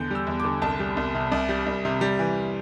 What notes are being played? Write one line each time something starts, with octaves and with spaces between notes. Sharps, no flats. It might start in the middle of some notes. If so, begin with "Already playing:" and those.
Already playing: E2 D3 G6
G3 E6
E2
D3 D6
C2 A5
G3
C2
C3
C2
G3
C2
C3
G3
E3